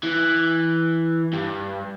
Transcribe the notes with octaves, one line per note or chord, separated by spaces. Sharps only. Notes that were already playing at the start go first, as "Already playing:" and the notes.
E3
G2